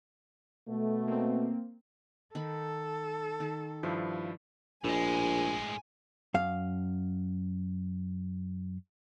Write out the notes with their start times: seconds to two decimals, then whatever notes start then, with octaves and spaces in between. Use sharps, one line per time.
0.68 B2 A3
1.07 A#3 C4
2.35 D#3 D#4 A4 B5
3.40 D#3 A5
3.83 G2 F3 E4 C5
4.84 A#1 A2 G#3 G#5
6.34 F#2 F5